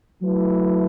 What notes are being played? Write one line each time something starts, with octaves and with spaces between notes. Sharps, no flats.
F#3 A3 E4 B4